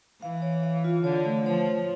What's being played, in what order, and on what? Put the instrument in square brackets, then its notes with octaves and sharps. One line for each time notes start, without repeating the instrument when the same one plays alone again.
[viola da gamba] E3 [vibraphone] F5
[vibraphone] C#5
F5
F4
[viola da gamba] D3 [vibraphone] C#5
[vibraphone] A3
[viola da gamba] F3 [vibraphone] C#5
[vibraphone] C#5